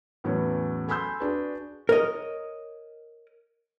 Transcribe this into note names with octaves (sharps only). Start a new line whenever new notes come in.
E2 A2 F#3 B3 C#4
A4 G#5 B5 C6 E6 G6
D4 F#4 G#4 B4
A#4 C#5 D#5